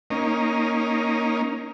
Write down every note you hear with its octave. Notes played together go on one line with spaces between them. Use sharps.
A#3 C#4 D#4